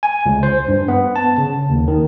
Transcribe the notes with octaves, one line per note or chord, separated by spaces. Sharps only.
G#5
C#2
C5
G2
B3
A5
C#3
D#2
D#3